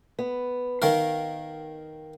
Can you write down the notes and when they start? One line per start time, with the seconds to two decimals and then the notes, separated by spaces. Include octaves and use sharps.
0.19 B3
0.82 D#3 A#4 F5